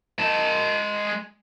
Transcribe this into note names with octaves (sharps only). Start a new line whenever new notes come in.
G#3 A5